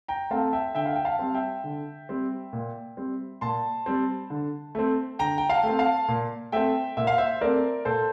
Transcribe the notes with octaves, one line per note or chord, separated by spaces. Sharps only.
G5 A#5
A3 C4 F5 A5
E5 G5
D3 E5 G5
F5
G5
F5 A5
G3 C4
E5 G5
D3
G3 C4
A#2
G3 C4
A#2 A5 C6
G3 C4
D3
A3 C4
D3 G5 A#5
G5
F5 A5
A3
C4
F5 A5
A#2
A3 C4 E5 G5
A#2 E5
F5
C5 E5
A3 C4 A#4 D5
A#2 A4 C5